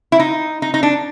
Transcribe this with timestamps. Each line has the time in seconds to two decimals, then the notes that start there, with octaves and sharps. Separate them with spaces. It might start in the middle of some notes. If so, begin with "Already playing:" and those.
0.12 E4
0.19 D#4
0.62 D#4
0.74 D#4
0.83 D4